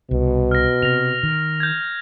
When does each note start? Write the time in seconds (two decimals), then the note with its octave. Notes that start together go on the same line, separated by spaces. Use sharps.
0.11 C2 B2
0.51 F6 A#6
0.83 C3 A#6 F7
1.23 D#3
1.60 G6 G#6